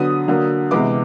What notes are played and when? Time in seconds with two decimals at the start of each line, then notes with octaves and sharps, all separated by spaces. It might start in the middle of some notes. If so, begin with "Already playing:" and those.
Already playing: D3 F#3 B3 D#6
0.28 D3 F#3 A#3
0.71 C3 E3 G#3 B3 D6